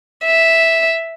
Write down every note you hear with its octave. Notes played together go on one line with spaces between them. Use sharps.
E5